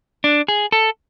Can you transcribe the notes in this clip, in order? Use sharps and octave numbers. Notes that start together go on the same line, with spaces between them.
D4
G#4
A4